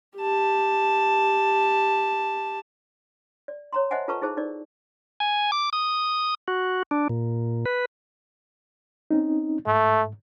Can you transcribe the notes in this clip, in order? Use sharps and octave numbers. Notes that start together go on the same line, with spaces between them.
G4 A5
D5
C#5 A#5 C6
C5 D#5 E5 F#5 G#5 A5
F4 A4 B4 A5 A#5 C#6
D#4 E4 G#4 C5 A5
D#4 A#4 D5
G#5
D6
D#6
F#4
D4
A#2
B4
C4 C#4 D#4
G#2 A3